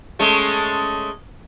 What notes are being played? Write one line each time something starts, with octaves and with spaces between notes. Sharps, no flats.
G#3 A3 C#4